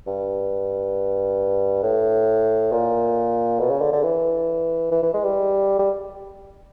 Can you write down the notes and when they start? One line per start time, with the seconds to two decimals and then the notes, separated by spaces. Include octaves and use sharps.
0.07 G2
1.83 A2
2.72 A#2
3.60 B2
3.70 C#3
3.81 D3
3.93 D3
4.03 E3
4.92 E3
5.03 E3
5.14 G#3
5.24 G3
5.79 G3